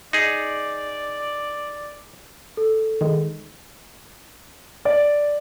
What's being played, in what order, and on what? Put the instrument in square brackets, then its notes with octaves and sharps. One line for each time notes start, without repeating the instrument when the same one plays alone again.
[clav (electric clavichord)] D#4 G#4 [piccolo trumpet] D5
[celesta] A4
[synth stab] D#3 G#3
[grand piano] D5